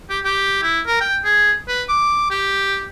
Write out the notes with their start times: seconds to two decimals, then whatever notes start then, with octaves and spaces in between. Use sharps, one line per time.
0.10 G4
0.25 G4
0.63 E4
0.86 A#4
1.01 G5
1.24 G#4
1.68 B4
1.89 D6
2.31 G4